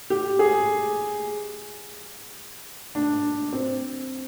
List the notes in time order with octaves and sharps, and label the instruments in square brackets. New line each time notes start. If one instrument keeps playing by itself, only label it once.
[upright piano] G4
G#4
D4
C4